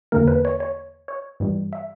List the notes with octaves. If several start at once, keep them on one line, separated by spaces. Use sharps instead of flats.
E2 D3 A#3 A#4
B4
C#5
C#5
C#5
G2 E3 G3
E5